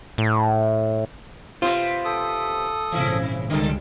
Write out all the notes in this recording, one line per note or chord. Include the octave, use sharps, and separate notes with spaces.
A2
C3 B3 F4 C5
A4 D#6
G#1 A#2 C#3 E3 E4
C#2 D3 G3 G#3 A4